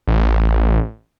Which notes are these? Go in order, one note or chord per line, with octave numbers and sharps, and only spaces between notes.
A1